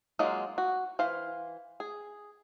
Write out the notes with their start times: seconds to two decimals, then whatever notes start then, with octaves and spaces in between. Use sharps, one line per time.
0.19 F#3 G#3 A#3 D#4 F4
0.58 F#4
0.99 E3 C5 F5
1.80 G#4